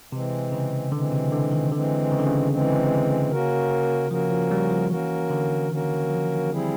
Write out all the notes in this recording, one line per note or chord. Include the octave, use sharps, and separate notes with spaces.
C3 E3 G#3 C4
C#3
D3 E3 G#3 C4
C3
D3
D#3
D3 E3 G#3 C4
C#3
D3
C#3
E3 G#3 C4
A#3 C#4 F#4 A#4
F3 A#3 C#4 F#4 A#4
F3
G3
F3
E3 A#3 C#4 F#4 A#4
D3
D#3 A#3 C#4 F#4 A#4
F3
G3 C4 E4 G#4